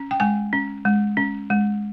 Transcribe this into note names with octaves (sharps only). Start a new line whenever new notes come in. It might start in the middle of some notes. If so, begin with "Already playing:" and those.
Already playing: C#4
G5
G#3 G#5
C#4
G#3
C#4
G#3